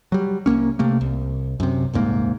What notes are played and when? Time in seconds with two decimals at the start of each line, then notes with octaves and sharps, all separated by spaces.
0.12 F#3 G3
0.46 C2 F2 A#3 C#4
0.79 C3 A3 A#3
1.01 C2
1.60 F#2 C3
1.93 D#1 C2 G#2 A#3